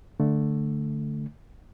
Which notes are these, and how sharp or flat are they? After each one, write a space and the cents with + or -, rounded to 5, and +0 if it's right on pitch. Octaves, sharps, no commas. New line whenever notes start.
D3 +0 A3 +0